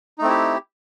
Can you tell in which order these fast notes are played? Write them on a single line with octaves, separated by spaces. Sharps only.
D#4 A3 C4 E4 G4